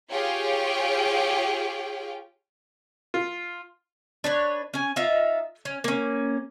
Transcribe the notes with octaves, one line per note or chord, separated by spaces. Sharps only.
F4 G4 G#4 C#5 F5 G5
F4
D4 B4 C#5
C#4 G#5
D#4 F4 E5 F5
C#4
A#3 C#4